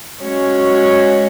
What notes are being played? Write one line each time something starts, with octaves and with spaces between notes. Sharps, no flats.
G#3 C#4 F#4 C#5